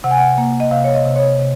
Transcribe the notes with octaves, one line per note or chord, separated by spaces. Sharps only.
C3 F#5
G#5
F#5
A#3
D#5
C3 F5
C#5
D#5
C3
C#5
C3